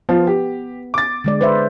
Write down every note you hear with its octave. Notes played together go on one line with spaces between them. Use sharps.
F3 B3 F4
G4
D6 A6
D3 G#3 D5
B4 C5 E5